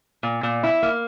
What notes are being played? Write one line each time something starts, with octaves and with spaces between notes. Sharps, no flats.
A#2
A#2
E4
A#3